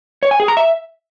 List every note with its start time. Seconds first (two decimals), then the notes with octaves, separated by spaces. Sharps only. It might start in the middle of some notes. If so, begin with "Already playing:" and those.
0.23 C#5
0.31 G#5
0.40 G#4
0.48 A#5
0.57 E5